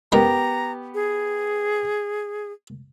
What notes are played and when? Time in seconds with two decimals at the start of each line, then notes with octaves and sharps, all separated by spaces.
0.12 G#3 B3 D#4 G4 A#4 A#5
0.94 G#4